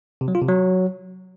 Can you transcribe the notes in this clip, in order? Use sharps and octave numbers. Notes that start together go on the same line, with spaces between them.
C3
F#3
F4
C3
F#3